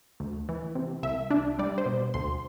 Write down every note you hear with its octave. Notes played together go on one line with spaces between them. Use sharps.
D2
E3
C3
C2 E5
D4
G3 D5
C5
B2
D2 C6